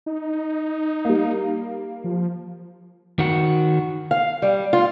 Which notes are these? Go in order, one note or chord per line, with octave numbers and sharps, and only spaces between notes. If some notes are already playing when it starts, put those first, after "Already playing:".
D#4
G3 A#3
F3
D#3 F#4
F5
G3
F4